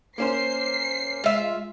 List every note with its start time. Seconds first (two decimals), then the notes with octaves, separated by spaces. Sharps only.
0.18 A#3 C#4 C5 C7
1.24 G#3 F4 E5